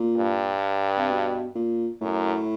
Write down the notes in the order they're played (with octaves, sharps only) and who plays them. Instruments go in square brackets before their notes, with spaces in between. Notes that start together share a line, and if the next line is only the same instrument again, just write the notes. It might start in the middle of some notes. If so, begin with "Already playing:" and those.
Already playing: [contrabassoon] A#2
[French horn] G2
[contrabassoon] C3
B2
A#2
[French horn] F#2 [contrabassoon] A2